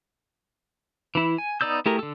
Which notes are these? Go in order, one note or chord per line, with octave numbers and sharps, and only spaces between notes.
E3 E4
G#5
B3 D#4 D5 E6 G6
A3 E4 G4 G#4 A#4
D3 A4